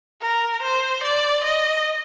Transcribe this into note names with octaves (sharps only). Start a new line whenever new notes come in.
A#4
C5
D5
D#5